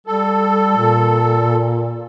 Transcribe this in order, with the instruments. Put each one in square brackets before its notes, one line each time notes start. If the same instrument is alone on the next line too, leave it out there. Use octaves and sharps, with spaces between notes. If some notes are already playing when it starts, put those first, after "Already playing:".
[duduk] G3 [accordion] A4
[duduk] A#2